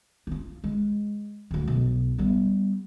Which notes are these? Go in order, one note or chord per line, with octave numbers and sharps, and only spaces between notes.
D#4 F4
G#3
D1 D2
B1
G3 B3